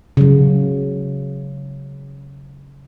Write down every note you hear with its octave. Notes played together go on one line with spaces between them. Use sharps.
C#3 F#3